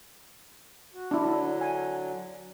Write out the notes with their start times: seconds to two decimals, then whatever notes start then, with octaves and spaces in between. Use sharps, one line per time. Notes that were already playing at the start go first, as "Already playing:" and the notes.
0.94 F#4
1.11 D3 F#3 D4 E4
1.61 G#5